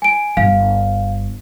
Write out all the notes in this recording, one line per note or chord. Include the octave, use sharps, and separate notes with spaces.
G#5 D7
G1 F5